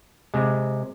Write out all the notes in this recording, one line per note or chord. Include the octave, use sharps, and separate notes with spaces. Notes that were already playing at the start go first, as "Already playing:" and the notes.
C3 G#3